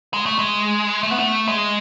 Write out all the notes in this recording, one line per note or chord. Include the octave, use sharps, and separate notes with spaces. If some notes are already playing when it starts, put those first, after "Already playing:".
G#3
A3
G#3
A3
B3
A3
G#3